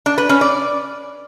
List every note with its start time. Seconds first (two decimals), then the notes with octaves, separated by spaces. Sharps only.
0.06 D4
0.18 B4
0.29 C#4
0.41 D5